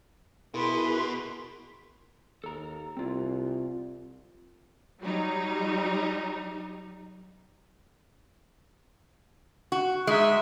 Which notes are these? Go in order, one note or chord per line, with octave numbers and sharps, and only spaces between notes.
B2 E4 G#4 A#4 B4 C6
D#2 A4 A#5
C2 C4 F4
F#3 G3 D#4
F#4
G#3 D#4 E5